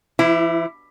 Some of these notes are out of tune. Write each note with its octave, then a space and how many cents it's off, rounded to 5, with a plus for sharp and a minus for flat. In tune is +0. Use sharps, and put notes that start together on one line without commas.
E3 +40 E4 +0